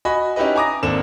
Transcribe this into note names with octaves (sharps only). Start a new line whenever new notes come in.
F#4 D#5 G#5 B5
C#4 D#4 E4 G4 B4 D#5
G#5 A#5 D6 D#6 A#6
G#1 A#3 C4 D4 A4 E7